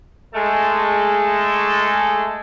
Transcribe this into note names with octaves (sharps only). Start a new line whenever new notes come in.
G#3 A3 A4